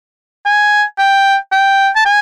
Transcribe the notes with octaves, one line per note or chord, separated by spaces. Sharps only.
G#5
G5
G5
A5
G#5